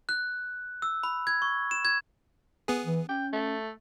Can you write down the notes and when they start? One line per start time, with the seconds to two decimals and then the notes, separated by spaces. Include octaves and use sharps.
0.09 F#6
0.82 E6
1.03 B5
1.27 G#6
1.42 C#6
1.71 E7
1.85 G#6
2.68 B3 G#4
2.85 E3
3.09 C#4 G5
3.33 A3